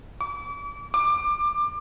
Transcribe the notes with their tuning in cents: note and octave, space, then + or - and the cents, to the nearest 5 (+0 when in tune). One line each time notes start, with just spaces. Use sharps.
D6 -40
D6 +20